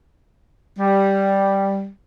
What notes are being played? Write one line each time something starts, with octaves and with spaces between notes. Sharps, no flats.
G3